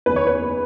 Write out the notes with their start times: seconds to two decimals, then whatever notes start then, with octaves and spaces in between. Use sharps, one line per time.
0.06 F#1 E2 D#3 B4
0.16 C#5
0.27 B4